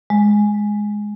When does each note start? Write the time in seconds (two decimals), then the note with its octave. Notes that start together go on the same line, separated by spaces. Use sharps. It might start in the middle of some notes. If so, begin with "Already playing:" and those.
0.10 G#3